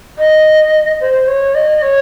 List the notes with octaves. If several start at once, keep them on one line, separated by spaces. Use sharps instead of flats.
D#5
C5
C#5
D#5
C#5